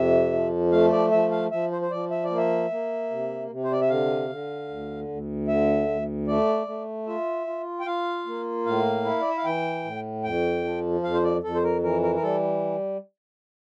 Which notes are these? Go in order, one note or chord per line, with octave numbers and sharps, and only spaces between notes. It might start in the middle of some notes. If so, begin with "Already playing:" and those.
Already playing: F2 C3 E5
F3
A3 F5
D5
F3 E5
F5
F3 E5
C5
C5
F3 D5
E5
D5
A#3
E5
A#3
C3
C3
C5
D5
E5
D3 F5
D3
D2
D2
D3 E5
D2
A3 D5
A3
F4 E5
F4
G5
F4 F5
A#3
A2 F5
E4
D5
E5
F5
E3 G5
A2
F2 G5
F3
F2 F5
C5
D5
F2 A4
C5
A#4
E3 A#4
A#4
A#4
G3 A4